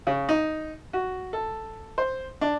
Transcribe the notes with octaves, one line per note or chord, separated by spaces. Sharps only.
C#3
D#4
F#4
A4
C5
D4